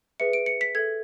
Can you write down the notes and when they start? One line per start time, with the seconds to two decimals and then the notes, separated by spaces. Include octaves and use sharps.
0.20 G#4 B4 E5 C#7
0.33 D7
0.46 C#7
0.61 B6
0.75 A4 E5 G#6